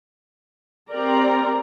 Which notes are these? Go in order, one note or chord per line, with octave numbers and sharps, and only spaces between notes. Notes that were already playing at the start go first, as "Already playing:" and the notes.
C4 G4 A#4 D5 A#5